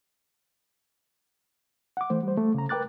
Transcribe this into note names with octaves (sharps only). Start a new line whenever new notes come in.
F#5 D6
E3 A3 C5
G3 C5
A3
C#3 A#5
A#4 B4 G5 D6 F#6 A6